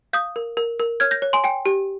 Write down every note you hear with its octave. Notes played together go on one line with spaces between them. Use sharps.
F5 D#6 G6
A#4
A#4
A#4
C#5 F6 G#6
G6 A#6
C#5
G#5 C6
G5 G#5
G4